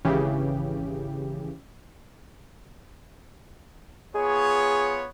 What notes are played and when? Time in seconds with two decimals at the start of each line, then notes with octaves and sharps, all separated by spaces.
0.04 G#1 C#3 E3 G4
4.15 B3 F4 G#4 C#5